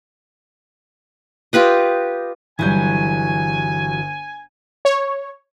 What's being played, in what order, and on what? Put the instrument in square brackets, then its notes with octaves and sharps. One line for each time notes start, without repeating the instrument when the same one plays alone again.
[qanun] F4 G4 B4 D#5
[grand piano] G1 G6 [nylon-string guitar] E3 F#3 G3 [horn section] G#5
[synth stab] C#5